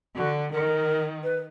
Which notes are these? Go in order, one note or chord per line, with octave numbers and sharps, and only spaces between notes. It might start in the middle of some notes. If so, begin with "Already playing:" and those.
D3 F#4
D#3 A#4
B4